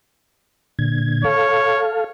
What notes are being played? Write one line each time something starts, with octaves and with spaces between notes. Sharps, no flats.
A#2 D3 G#6
A4 C#5 F5